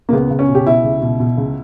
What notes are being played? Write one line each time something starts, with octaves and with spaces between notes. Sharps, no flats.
A#3
C#2 B3
C#2
C#4
B2
G4
B2 E4
C#2
B2
B2
C#2